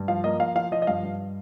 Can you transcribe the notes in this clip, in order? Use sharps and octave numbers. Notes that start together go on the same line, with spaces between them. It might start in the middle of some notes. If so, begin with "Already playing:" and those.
Already playing: G2
F3 F5
A#3 D#5
F3 F5
F3 F5
F3 D#5
D#5
G2 F5
G2